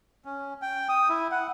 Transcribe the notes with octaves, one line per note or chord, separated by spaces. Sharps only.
C#4
G5
D#6
E4
F#5